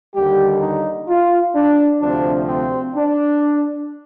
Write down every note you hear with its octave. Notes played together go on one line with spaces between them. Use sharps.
D#2 D3 G3 G4
D#4
F4
D4
D2 C3 F3 C4 D4
C4
D4